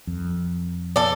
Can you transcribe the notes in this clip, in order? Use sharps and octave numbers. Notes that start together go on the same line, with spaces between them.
F2
A4 D5